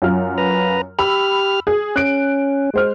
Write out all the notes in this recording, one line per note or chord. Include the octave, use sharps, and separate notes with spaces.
F#2 F4 F6
B4 A#5
G4 B5 E6 F6
G#4
C#4 F#6 D7
G#3 C5 F6